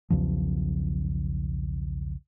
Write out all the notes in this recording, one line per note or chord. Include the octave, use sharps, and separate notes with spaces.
B1 E2 C#3 F3